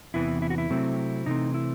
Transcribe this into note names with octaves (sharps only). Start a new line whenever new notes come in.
E2 C3 E3 B3 E4
E4
F#4
E4
C3 F#3 A3 C4
C3 E3 A3 C4 D#4
E4